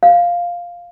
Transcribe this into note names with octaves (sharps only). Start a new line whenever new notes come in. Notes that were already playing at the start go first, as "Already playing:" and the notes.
F5